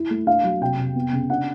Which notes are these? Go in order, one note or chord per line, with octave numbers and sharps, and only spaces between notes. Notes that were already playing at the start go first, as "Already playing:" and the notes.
Already playing: E4
A3
D4 F5
F#3
C3 G5
C3
B3
C#3
D4 F#5